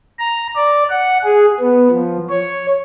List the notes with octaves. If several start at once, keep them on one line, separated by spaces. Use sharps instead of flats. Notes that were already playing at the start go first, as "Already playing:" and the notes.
A#5
D5
F#5
G#4
B3
F3
C#5